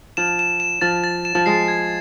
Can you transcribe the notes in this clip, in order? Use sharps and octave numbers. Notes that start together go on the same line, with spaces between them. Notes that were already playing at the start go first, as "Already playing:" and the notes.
F3 E7
E7
E7
F3 A6
A6
E7
F3
G#3 C7
G#6